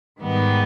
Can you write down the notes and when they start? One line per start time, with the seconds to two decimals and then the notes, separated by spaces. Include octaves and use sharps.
0.20 G#2 D#3 G3 B3